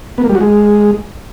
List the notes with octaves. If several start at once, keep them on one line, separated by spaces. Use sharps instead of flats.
B3
A#3
G3
F#4
G#3